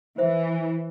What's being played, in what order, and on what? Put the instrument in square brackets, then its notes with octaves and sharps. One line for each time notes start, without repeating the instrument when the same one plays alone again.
[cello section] E3 [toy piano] C5 E5